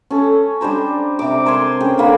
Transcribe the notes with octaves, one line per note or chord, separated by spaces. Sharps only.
C#4 A4
G3 D4 C5 A#5
C3 D6
A#4 C5 G#5 C6
C#4 G#4 G5
D3 A#3 B5